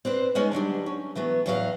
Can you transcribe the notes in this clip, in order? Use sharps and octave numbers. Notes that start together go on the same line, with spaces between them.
C4 D4 B4 C5
G#3 B3 C#4 D#4
D3 F#3 G3 D4
C#4
E3 F#3 A3 B3
E2 A2 F#3 F#4 A4 F5